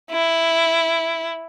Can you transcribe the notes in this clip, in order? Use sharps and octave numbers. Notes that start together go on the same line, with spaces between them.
E4